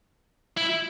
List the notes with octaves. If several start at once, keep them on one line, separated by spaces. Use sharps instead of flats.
E4